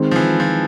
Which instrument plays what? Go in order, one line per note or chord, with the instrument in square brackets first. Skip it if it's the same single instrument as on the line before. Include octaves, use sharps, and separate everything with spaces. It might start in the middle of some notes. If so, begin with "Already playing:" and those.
Already playing: [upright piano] D#3 G#3 C4
[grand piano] F3
E3
F3